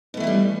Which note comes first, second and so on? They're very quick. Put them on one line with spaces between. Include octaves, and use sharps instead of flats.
B2 A3 E3 A#3 G3